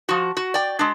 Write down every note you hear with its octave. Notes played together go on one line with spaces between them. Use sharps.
F3 F#4
F#4
D5 G5
G#3 D4